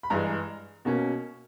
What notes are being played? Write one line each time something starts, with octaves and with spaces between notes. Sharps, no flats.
B5
G2 E3 G#3 A#5
B2 A#3 C#4